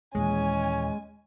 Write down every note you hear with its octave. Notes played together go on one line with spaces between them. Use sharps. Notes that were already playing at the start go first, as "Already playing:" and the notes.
D#2 A#2 E3 G#3 C#4 G#5